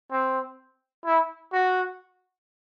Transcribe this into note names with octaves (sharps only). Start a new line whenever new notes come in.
C4
E4
F#4